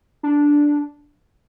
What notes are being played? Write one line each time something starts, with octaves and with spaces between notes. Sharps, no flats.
D4